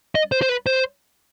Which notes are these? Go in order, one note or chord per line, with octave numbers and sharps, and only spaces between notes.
D#5
C5
C5
B4
C5